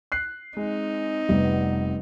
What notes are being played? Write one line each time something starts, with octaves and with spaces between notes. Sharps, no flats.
F#6 C7
G#3 C4 D#4
F1 G3 B3